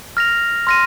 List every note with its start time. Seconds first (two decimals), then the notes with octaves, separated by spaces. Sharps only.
0.17 F6 A#6 F7
0.67 C6 F6 A#6 D#7